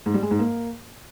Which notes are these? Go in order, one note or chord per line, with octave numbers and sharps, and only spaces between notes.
G#2
G3
G#3
G#2
A#3